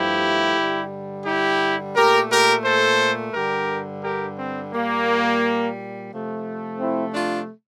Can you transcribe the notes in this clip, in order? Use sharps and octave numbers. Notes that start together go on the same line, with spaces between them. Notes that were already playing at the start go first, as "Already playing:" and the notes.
Already playing: G2 F3 A3 E4 G4
G2 D3 G3
E4 G4
A#2 A3 G4 A#4
G4 A#4
A4 C5
G2 D3 G3 G4 A#4
G4 A#4
C4
A#2 G3 A#3
C3 F3 A3
C4 E4
D4 F4